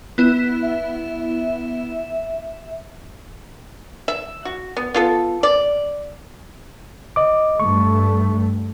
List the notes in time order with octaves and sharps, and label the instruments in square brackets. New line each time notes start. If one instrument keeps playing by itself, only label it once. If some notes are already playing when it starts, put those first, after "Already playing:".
[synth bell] B3 E4
[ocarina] E5
[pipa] E5
F#4
B3
B3 F4 A4
D5
[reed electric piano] D#5 D6
[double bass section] G2 A3 [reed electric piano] C#6